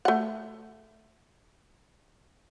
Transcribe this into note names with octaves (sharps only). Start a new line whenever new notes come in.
A3 F#5